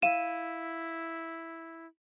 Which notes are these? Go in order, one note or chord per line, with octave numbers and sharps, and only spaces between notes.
E4 F5 D#7 E7